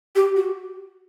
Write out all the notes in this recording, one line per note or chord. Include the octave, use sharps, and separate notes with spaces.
G4
F#4